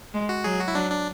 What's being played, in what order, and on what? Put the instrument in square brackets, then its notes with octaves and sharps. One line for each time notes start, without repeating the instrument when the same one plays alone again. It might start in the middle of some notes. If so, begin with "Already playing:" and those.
[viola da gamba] G#3
[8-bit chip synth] F#4
[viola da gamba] F#3 [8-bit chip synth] G#4
[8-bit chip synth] F#4
E4
[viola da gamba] F#3 [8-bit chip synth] D4
[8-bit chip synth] D4